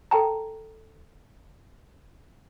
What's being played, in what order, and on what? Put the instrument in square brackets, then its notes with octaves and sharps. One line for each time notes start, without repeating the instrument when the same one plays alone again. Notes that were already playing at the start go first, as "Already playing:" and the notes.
[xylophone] A4 A#4 G5 A5 A#5